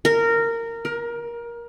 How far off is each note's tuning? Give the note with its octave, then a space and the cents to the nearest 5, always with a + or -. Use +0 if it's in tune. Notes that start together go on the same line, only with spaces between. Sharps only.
A#4 -15
A#4 +20